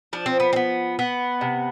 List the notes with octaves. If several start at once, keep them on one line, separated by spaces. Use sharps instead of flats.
F3 D4
C4
B3
C4
B3
B3
C3